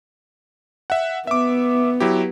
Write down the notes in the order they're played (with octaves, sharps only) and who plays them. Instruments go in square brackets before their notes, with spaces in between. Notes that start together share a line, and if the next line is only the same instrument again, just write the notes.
[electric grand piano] E5 F#5
[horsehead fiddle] B3 [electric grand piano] E5 D6
[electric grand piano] F#3 E4 G4